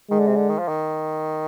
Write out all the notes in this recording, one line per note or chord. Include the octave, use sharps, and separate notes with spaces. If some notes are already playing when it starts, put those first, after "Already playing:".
D#3 G#3
D3
C3
D3
D#3
F3
D#3